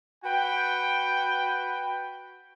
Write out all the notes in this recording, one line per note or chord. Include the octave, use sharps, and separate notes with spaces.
F#4 B4 G5